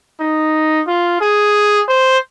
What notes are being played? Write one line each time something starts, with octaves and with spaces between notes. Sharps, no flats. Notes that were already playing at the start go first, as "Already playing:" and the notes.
D#4
F4
G#4
C5